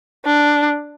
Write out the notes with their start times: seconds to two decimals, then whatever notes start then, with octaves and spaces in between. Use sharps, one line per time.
0.25 D4